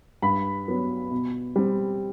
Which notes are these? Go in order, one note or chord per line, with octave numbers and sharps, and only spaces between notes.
G2 B5
F#3 B3
B2
G3 C4